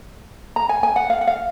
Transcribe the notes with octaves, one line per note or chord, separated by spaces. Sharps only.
A#5
G#5
G#5
F#5
F5
F#5
F5